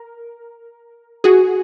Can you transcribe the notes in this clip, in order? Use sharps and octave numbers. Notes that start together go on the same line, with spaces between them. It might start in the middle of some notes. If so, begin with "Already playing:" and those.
Already playing: A#4
F#4 G#4